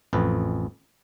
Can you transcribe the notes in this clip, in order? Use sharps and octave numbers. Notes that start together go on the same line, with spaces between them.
A1 F2 B4